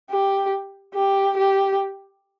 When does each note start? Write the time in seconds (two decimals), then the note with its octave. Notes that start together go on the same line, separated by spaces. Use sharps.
0.11 G4
0.95 G4
1.38 G4